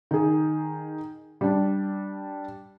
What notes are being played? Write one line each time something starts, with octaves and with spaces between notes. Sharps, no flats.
D#3 G#4
G3 D4